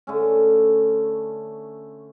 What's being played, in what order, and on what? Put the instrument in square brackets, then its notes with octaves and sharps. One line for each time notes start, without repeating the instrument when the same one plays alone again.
[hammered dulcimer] D3 A3 C#4